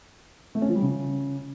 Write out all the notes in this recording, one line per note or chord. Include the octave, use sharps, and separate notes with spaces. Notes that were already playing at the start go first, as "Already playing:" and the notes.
A3
C#4
F3
G3
C#3